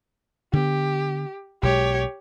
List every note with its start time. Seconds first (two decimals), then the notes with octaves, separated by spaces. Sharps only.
0.53 D3 B3 G4
1.63 B1 B2 G#3 G4 C#5